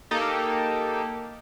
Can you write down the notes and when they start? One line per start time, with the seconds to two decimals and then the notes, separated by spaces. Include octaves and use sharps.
0.11 A#3 D#4 G4 A4